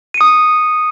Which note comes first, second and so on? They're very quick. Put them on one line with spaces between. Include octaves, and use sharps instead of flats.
D#7 C#7 D#6